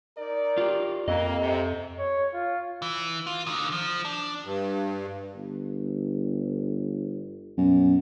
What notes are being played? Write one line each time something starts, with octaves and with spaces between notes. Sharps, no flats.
D#4 A#4 D5
F4 G4
F2 A#3 D#5
G#2 C3
C#5
F4
E3
F4
D3 D#3
F3
D4
G2
G1
F#2 B2